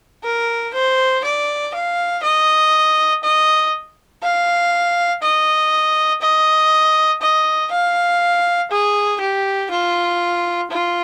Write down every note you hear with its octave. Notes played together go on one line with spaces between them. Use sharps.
A#4
C5
D5
F5
D#5
D#5
F5
D#5
D#5
D#5
F5
G#4
G4
F4
F4